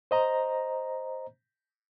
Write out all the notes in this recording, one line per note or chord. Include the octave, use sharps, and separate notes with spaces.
C5 D#5 A#5